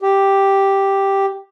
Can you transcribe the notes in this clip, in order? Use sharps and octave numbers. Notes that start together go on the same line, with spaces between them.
G4